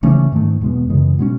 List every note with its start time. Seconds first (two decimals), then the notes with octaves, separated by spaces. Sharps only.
0.03 C#3 E3 A3 C#4
0.32 G#2 D#3 A3
0.61 E2 B2 G#3 B3
0.89 F#2 C#3 E3 G#3
1.19 B2 G#3 C#4